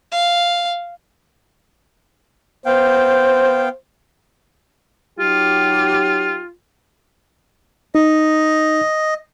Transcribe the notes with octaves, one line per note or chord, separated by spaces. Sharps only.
F5
B3 C5 F5 G5
F#3 D#4 F4 G4
D#4 D#5